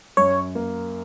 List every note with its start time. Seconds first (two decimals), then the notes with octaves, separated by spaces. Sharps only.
0.17 F#2 C#5
0.55 A#3